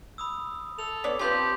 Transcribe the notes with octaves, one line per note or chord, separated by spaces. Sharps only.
B5 D#6 E6
A4 F7
B3 C#5 D5
C4 F4 G4 B4 A5 C6 G6